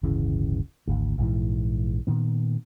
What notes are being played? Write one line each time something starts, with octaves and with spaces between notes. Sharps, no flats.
D1 G1 C#3 E3
G#1 D2
A#1 G#2 E3
A#2 D#3 B3